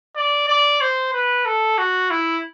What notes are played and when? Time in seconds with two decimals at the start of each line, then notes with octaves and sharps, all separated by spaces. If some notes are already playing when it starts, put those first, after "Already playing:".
0.16 D5
0.48 D5
0.81 C5
1.14 B4
1.46 A4
1.78 F#4
2.11 E4